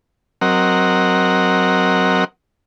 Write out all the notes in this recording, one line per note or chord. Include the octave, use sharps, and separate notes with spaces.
F#3 C4 A#4 D#5 F#5